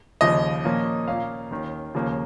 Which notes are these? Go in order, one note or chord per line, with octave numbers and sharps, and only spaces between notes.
D#2 C#3 F3 D#5
A#2 F3 A#3 C#4
A#2 A#3 C#4 F5
D#2 D#3 C#4
D#2 C#3 F3 A#3 C#4